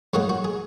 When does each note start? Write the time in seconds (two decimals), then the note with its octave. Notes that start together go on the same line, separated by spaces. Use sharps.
0.14 G#2 F#3 A#3 D#4 F#4
0.29 F#4
0.44 G#4